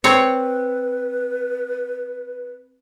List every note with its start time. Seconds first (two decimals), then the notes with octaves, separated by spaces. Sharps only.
0.04 C4 B4 C#5